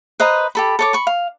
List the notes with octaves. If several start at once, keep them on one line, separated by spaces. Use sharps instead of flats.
B4 C5 D#5 A#5
G4 A4 B5
A4 C#5 D6
B5 C#6
F5